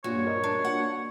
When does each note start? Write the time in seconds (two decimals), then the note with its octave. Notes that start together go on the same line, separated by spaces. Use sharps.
0.04 G2 A#2 F#4 C#5
0.26 A#4 D#5
0.44 D4
0.65 A#3 D4 F#4 F#5